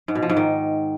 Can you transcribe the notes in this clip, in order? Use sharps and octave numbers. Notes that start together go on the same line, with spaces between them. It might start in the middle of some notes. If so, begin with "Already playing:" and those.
G#2
B2
F3
G#2
D#3